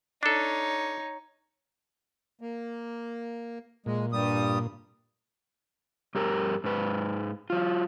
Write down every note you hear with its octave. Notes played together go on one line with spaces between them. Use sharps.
D4 D#4 A4 C#5
A#3
A#2 G#3
G2 G3 D#6
G2 G4 A#4
G#2 B4
F#3 F4